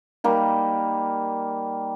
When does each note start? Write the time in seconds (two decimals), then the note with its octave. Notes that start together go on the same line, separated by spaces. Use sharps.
0.24 G3 A#3 D#4